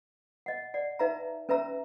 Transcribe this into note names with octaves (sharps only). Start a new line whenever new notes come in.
D#5 F#5
D5 F#5
D#4 B4 E5 F5 A#5
C#4 B4 E5 A#5 E6